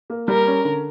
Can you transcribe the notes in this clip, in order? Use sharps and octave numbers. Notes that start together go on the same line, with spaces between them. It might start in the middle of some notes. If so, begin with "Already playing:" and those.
A#3
G3 A#4
C#4
D3